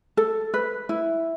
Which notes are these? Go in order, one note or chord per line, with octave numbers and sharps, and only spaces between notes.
A4
B4
E4